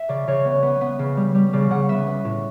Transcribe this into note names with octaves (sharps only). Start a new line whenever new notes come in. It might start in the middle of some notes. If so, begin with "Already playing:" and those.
Already playing: E5
C#3 D5
C#3 C#5
B3
B3
B3
C#3
G3
G3
C#3 D5
C#3 F#5
B3 E5
B3
A2